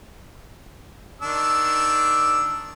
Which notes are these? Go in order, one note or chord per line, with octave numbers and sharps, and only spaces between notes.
D#3 D4 E6